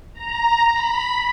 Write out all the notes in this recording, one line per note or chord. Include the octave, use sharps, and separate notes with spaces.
A#5
B5